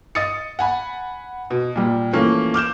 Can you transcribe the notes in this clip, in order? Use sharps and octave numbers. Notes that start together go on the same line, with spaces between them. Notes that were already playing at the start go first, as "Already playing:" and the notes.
D#5 D#6 A6 C#7
F#5 G#5 B5
B2
A#2 G3
E3 F3 A3 A#3 C#4
D6 F6 G6 E7